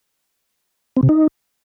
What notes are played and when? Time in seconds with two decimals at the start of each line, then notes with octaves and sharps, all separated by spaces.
0.97 C4
1.03 C3
1.09 D#4